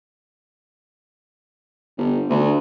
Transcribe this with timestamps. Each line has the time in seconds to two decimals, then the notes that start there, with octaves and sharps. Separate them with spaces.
1.98 G1
2.30 D2